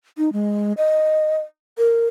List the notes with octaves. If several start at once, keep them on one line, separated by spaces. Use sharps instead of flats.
D#4
G#3
D#5
A#4